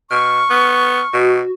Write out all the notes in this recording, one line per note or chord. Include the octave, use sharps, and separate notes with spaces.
B2 C#6 F6
B3
B2 F#4